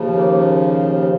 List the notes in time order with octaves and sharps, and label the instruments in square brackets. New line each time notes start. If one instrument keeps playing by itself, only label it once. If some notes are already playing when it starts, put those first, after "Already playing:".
Already playing: [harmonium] D#2 C#3 F3
A#3